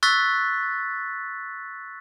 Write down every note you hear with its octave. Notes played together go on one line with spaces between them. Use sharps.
C#6 E6 F#6 A6 B6